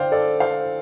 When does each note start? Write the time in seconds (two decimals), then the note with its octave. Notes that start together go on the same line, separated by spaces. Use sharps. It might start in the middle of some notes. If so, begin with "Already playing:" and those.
Already playing: D3 C5 D5 F5 G5
0.12 A4 D5
0.40 C5 F5